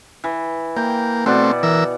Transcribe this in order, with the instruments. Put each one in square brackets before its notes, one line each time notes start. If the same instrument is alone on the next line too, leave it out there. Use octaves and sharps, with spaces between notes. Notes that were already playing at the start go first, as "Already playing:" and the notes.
[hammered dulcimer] E3
[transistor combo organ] A#3 [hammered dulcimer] G5
[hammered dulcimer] B2 D5 F#5 [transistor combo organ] A3 C4
[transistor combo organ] E3 A#4 E6